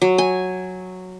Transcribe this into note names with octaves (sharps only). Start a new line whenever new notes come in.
F#3
G#5